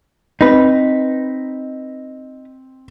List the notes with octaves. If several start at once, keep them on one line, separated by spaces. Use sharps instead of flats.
C4 D#4 B4